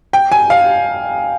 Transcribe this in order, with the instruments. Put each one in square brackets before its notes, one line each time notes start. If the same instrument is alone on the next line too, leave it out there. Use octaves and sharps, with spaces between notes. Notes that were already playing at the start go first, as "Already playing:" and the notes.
[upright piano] G5
G#5
F5